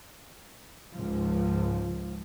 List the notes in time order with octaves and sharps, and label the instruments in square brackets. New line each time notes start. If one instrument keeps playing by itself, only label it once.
[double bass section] C#2 G#2 F3